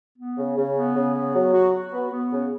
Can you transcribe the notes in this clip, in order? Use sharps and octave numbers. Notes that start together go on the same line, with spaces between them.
B3
C#3
C#3
B3
C#3
B3
F#3
F#4
F#4
B3
B3
C#3